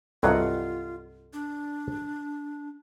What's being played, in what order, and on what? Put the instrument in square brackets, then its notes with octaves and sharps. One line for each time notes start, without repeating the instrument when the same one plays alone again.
[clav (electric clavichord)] C2 G2 F#3 [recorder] F4 [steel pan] A4 D#5 F#5
[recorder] D4